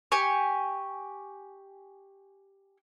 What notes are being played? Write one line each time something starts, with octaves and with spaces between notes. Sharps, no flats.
G4 G#5 C#6